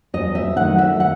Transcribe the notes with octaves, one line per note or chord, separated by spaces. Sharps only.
E2 D#5
E5
D#3 F#3 A3 D#4 F#5
E5
F#5